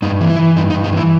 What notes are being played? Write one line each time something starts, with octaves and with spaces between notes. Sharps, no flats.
G2 D#4
E3
E4
E3
G2 D#4
D#4
G2
D#4
E3 E4